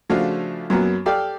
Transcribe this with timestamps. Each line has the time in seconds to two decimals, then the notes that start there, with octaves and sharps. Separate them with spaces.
0.09 C#3 F3 A3 D4 F4 F#4
0.70 F#2 F#3 A#3 B3
1.06 G4 A4 D5 F5 G5